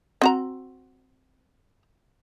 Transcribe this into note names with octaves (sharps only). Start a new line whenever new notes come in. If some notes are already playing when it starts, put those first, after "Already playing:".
C4 F#4 A#5